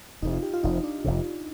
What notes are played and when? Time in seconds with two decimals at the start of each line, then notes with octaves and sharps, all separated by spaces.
0.22 F1 F2 C3 D#4
0.33 F4
0.43 G4
0.54 F4
0.63 F1 F2 C3 D#4
0.84 D4
1.04 F1 F2 C3